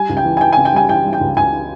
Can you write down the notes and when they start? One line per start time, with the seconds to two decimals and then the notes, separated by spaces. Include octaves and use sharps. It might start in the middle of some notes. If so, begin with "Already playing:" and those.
Already playing: G3 G#5
0.10 C#2
0.17 G5
0.25 E3
0.37 G#5
0.41 E3 G5
0.53 C#3 G#5
0.65 G5
0.73 G3 G#5
0.89 E3 G5
1.04 G3
1.13 G5
1.21 C#2
1.37 C#2 G#5